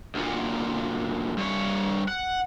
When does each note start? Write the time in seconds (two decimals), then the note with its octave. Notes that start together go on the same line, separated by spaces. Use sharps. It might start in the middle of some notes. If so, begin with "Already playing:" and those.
0.15 D2 A#2
1.37 G2 C#5
2.08 F#5